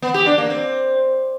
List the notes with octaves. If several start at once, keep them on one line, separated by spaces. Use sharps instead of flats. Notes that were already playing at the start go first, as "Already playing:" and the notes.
B3
G4
D4
A#3
C4